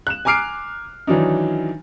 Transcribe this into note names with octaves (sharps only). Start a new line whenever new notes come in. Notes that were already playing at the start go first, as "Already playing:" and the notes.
F#6 E7
G#5 A#5 D6 F6 C7 D7
D#3 E3 F#3 D4 D#4